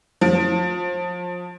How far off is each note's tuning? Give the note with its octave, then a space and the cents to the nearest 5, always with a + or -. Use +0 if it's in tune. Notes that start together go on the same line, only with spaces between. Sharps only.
F3 +25